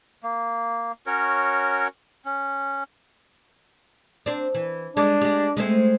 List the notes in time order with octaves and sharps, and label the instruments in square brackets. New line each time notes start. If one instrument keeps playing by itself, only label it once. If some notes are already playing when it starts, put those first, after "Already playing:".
[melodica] A#3
C#4 F#4 A#4 C#5
C#4
[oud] C4 D4
E3
[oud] G3 G#3 [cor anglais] D4
[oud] G#3 G4
G#3 A3 C4